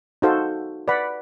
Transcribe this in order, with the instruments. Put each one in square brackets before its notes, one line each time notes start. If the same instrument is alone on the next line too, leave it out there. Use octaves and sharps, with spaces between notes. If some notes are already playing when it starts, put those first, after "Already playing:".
[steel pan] D#4 F#4 A4 C5 F5
B4 D5 F#5 B5